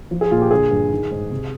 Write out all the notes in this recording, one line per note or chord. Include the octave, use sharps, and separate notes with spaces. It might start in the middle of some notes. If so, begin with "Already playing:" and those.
F3
G#4
A#2 F4
G4
D3 G#4
G2
D#3
G#2
C3